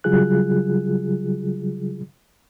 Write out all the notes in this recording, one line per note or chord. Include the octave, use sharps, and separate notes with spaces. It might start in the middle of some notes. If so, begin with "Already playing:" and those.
C#3 F#3 G3 F4 G#4 F#6